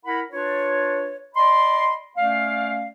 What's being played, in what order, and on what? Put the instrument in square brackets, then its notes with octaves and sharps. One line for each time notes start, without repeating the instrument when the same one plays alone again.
[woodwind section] E4 A#4 F#5 B5
D4 F4 B4 C#5
D5 D#5 B5 C6
A3 C#4 D5 F5